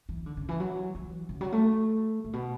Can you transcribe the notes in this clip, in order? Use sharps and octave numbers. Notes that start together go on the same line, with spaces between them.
E3
D3
C#3
E3
F#3
E3
C#3
F#3
A3
A2
B2